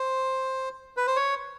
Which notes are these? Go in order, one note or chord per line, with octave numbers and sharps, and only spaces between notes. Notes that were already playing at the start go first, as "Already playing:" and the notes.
Already playing: C5
B4
C5
C#5